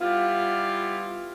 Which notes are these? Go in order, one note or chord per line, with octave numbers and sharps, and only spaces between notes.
G3 B3 E4 F4